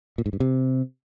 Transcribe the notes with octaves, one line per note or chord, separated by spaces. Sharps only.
A#2
G#2
G2
C3